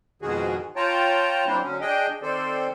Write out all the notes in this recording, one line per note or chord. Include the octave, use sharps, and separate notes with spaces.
F2 G#2 B2 D#3 F#4 G#4
F4 C#5 G5 A5 A#5
F#3 A#3 C4 D4 E4 C5
D3 F#3 C#4
D4 G#4 D#5 G5
D#3 C4 A4 C5 D5